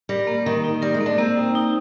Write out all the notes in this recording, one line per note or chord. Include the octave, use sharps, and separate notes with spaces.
G3 A#4
A#3
D#3 A#3
D#4
G3 A#4
G#3
A#3
D4
A#3 C4
D#4
D#4